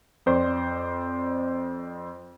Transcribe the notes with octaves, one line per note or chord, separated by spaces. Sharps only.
F2 C5 D5 C6